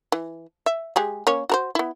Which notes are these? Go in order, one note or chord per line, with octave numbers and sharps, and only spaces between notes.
E3
E5
G#3 G4 G#4
A#3 C#4 C#5
F#4 A#4 C5
B3 E4